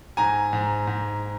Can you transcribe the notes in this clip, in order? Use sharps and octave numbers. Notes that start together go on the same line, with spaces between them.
G#2 G#5 A#5
G#2
G#2